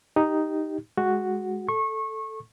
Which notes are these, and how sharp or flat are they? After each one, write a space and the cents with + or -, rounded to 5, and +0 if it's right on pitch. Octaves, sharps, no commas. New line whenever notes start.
D#4 +0 G4 +0
G#3 +0 F#4 +0
A4 +0 C#6 -25